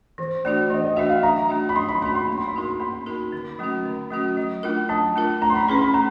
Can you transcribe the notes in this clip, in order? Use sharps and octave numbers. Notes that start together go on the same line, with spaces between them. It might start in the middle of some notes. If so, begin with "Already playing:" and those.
E3 C5
A3 D4 F#4 D5
E3 D#5
D#5
A3 D4 F#4 E5
F5
F#3 A#5
A3 D4 F#4
B5
F#3 C6
B5
A3 D4 F#4 B5
C6
A#3
C6
B5
D#4 F#4 A#4 C6
A#3 B5
D#4 F#4 A#4
D3
F#3 A3 C#4 F#4
D3
F#3 A3 C#4 F#4
F#3
A3 D4 F4 A#4
F#3 A5
A3 D4 F4 A#4
A3 A#5
C6
B5
C#4 E4 G#4 B4 B5
B5
A3 A#5